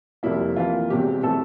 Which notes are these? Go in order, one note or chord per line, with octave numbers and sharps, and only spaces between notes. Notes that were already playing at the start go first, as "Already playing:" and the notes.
F1 F2 C3 G3 A#3 E4
F2 E3 A#3 F4
E1 E2 C3 G4
C3 E3 A3 A4